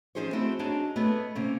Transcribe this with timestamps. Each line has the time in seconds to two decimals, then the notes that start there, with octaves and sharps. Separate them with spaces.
0.15 F3 C#4 D#4 G#4 C5 C#5
0.33 A3 C4 E4 F#4
0.59 D4 D#4 F#4 G#4 C#5 D#5
0.96 A3 B3 C#5 D#5
1.35 C3 A#3 C#4